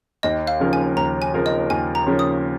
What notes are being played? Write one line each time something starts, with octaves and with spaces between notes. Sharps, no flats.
D#2 D#5
F5
C#3 F3 C#4 A#4
G#5
D#2 A#5
G#5
C#3 F3 C#4 A#4
D#5
D#2 G#5
A#5
C#3 F3 C#4 A#4
D#6